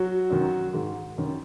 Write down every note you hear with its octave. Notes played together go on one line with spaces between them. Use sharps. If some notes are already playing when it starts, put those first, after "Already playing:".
Already playing: F#3 F#4
F#2 D#3
G#2 D#3
F#2 D#3